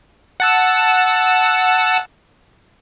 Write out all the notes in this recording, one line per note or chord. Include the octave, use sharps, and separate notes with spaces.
F#5 A5 E6